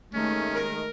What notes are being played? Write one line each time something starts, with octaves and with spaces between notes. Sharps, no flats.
D#2 D#3 G#3 A3 C#4
A#4